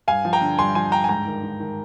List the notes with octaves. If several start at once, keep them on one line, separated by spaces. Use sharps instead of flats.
G2 F5 G#5
F3
G5 A#5
D3
G2 G#5 C6
F3 G#5 C6
D3 G5 A#5
G#5
G#2 G5 A#5
D#3
D#3
D#3